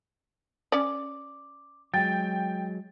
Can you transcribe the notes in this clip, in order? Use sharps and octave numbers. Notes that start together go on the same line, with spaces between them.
C#4 D5 D6
F#3 G#3 G5 A6